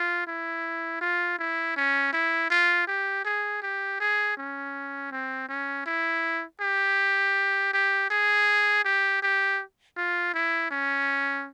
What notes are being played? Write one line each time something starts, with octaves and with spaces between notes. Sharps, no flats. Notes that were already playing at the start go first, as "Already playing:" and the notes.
Already playing: F4
E4
F4
E4
C#4
E4
F4
G4
G#4
G4
G#4
C#4
C4
C#4
E4
G4
G4
G#4
G4
G4
F4
E4
C#4